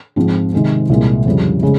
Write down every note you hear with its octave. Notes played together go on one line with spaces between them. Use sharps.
G#2 F3 C4 F4
C3 D#3 G#3 C4
C2 A#2 G#3
F2 C#3 G3
C#3 G#3